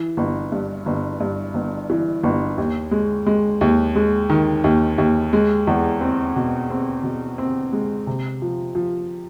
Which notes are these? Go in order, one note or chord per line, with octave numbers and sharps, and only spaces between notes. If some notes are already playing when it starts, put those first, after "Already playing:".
Already playing: E3
G1
G2
G1
G2
G1
E3
G1
D#2
G#3
G#3
D#2
G#3
D#3
D#2
D#2
G#3
E2
C4
B2
C4
B2
C4
G#3
C3
F3
F3